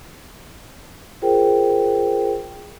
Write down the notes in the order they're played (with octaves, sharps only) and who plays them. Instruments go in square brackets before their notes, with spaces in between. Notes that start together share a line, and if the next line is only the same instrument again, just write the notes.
[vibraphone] F4 G#4 A#4 C5 G5